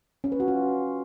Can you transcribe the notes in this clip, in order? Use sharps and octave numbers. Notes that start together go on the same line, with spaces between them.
C#4
B4
F#4
F4